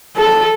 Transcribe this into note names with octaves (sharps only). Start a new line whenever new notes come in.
A4